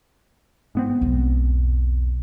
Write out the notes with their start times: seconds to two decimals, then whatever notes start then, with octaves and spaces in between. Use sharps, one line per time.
0.75 G#2 B3 C4
1.01 B1 E2